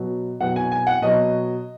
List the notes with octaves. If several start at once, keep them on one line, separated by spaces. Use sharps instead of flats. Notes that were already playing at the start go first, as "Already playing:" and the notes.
Already playing: B2 F#3
B2 F#3 F#5
G#5
G#5
F#5
B2 F#3 D#5